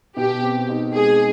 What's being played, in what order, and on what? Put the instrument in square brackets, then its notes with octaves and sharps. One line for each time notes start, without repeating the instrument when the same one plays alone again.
[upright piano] B2 [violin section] G4
[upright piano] C4
D#4
[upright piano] G#3 [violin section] G#4